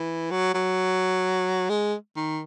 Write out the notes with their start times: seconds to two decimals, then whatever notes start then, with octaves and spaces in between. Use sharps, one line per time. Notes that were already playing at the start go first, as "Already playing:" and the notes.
Already playing: E3
0.31 F#3
0.54 F#3
1.69 G#3
2.16 D#3